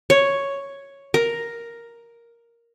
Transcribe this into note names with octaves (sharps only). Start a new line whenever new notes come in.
C#5
A#4